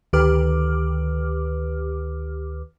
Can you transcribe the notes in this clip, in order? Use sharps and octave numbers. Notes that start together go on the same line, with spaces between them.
D2 D#3 G4 B4 D6 F6